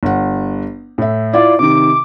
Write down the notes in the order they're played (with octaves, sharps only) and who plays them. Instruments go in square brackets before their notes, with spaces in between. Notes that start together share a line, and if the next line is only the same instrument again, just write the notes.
[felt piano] G1 F#5
A2 E5
[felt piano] E4 F4 [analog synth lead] D5
[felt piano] C3 D#3 [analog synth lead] D6